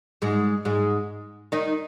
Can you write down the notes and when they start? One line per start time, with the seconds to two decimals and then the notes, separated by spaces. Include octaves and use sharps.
0.22 G#2 G#3
0.65 G#2 G#3
1.52 D#3 D#4